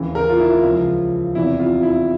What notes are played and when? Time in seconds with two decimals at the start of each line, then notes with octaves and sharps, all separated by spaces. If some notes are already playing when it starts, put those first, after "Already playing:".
Already playing: D#2 C#3 E3
0.15 A#4
0.30 F4
0.39 E4
0.63 C#2 C#3 F3
1.35 E2 C3 E3 E4
1.59 F4
1.83 E4